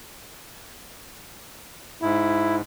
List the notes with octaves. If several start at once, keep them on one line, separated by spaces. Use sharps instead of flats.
G#2 E4